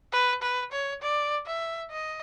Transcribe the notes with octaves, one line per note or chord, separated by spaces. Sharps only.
B4
B4
C#5
D5
E5
D#5